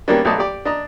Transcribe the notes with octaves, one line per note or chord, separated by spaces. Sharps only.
D#3 G3 A#3 B3 C#4 D4
B1 F#3 A3 D5 D#5 A5
G4 D5
D4 D#5 A#5